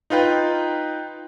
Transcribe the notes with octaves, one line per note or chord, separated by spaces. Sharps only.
D#4 F4 B4 G5